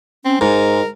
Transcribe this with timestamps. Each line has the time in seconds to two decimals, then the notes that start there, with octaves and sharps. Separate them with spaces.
0.25 C4 C#4
0.41 G#2 G#3 A#4